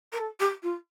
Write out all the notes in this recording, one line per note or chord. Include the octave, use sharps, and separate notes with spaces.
A#4
A4
G4
F4